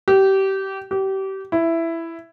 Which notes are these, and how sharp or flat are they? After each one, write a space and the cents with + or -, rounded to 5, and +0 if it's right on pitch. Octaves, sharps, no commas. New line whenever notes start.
G4 -25
G4 -30
E4 +10